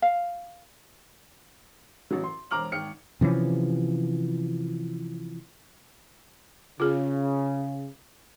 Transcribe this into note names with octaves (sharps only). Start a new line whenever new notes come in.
F5
A1 F#3
C6
E1 C5 A#5 D6 F6 F#7
G#1 G5 F6 C#7
C3 E3 F3 C#4
C#3 F4 G#4